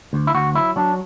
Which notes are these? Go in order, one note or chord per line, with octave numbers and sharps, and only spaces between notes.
D2
E4
D2 F#4
F#3 E4
F#3 D4